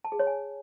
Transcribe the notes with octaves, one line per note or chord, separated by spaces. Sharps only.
A5
G#4
C#5
G#5